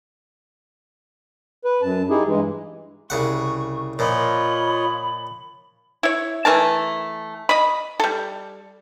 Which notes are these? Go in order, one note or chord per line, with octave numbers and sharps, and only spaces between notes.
B4
F#2 A5
D#4 E4 G4 G#4
G2 E3 G#3
C2 C#3 F#5 C#6
A#2 F3 F4 C#5 D#5 B5
E4 C#5
E3 A3 A#4 A5
D#5 B5
G3 A4